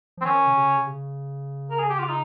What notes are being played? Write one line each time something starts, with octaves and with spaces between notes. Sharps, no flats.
F3
C4
D#3 C#4
C3
C#3
C3
C#3
A#4
G#4
G4
F4
D#4